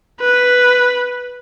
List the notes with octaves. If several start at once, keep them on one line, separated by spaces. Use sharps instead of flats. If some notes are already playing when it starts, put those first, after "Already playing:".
B4